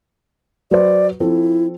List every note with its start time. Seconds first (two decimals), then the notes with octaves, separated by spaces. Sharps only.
0.71 F#3 B4 C5 D5
1.20 F3 C4 E4 A4